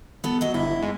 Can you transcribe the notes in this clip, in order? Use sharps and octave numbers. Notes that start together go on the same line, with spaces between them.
B3 A4
F#3 D#5
G1 E4
G#2